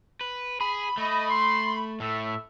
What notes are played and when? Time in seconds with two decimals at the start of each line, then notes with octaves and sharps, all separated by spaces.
0.21 B4
0.61 G#4 B5
0.98 A3 D#5
1.29 C6
2.00 A2 A4 E5